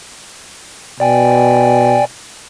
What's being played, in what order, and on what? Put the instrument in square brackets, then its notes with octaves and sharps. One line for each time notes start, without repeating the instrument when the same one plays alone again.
[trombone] B2 [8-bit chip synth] D5 G5 G#5